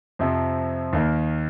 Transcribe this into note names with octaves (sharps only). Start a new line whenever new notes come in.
F2 C3 F3
D#2 D#3 A#3